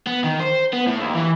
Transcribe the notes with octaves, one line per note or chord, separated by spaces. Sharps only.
B3
D#3
C5
B3
A2
D#2
E3